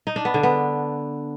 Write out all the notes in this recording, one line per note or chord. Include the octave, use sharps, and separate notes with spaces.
D#4
D4
B3
D3
B3